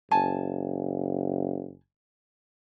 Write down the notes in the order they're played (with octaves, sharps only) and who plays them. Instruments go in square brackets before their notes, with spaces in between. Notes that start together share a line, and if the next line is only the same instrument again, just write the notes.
[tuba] F#1 [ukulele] G#5 A5